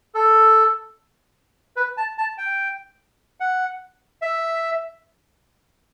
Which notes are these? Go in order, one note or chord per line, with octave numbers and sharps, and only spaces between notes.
A4
B4
A5
A5
G5
F#5
E5